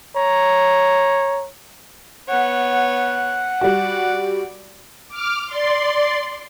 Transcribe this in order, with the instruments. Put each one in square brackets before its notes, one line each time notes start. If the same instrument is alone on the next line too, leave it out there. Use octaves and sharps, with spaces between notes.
[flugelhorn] C#5 [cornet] A#5
[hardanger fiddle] B3 C#5 [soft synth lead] F#5
[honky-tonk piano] G3 F#4 [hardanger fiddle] D5
[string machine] D6 F6
D5 C6